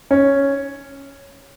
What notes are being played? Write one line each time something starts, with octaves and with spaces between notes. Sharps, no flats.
C#4